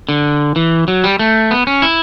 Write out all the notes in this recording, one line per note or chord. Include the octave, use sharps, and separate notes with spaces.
D3
E3
F#3
G3
A3
B3
C#4
E4